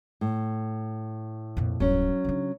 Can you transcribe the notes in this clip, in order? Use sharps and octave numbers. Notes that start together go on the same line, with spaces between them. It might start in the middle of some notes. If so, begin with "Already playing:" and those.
A2
F2 A#2
D1 G2 F#3 C#4
C#3 D4